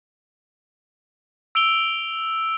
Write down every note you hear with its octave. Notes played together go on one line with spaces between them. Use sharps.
E6 D7 F7 G7